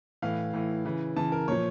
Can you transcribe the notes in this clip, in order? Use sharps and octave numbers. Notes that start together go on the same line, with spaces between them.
A2 E3 F5
A2 E3
C#3 E3
C#3 E3 A5
A#4
A#2 F3 C#5